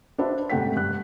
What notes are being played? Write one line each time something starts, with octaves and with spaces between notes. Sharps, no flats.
D4 F#4 B4 C5 E5
G#2 C3 A3 F#5 G5 B6
G2 F#6